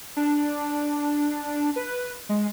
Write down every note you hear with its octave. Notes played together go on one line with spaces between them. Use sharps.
D4
B4
G#3